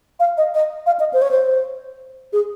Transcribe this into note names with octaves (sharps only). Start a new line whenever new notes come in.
F5
D#5
D#5
F5
D#5
C5
C#5
C5
G#4